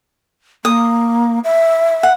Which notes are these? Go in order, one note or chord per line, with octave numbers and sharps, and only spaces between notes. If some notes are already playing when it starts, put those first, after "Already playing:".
A#3 D#6
E5
F#5